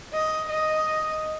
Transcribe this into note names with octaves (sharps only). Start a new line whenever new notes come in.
D#5
D#5